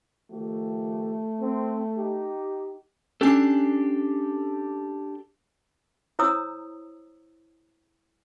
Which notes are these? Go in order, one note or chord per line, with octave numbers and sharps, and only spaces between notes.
D#3 F3 A3 G4
C4
D#4 G4
C#4 D4 G4 A4 G#5 C7
E4 C5 C#5 A#5 D#6 E6